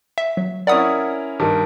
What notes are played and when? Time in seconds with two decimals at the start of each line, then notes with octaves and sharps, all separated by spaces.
0.18 E5
0.37 F#3
0.67 C#4 E4 A#4 D5 F#5 D#6
1.40 G2 D#3